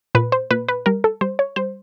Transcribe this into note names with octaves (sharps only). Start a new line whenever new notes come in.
A#2 B4
C5
A#2 B4
B4
G3 A#4
A4
G3 C5
C#5
G3 C5